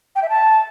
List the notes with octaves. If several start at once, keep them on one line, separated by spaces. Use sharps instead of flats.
G5
E5
A5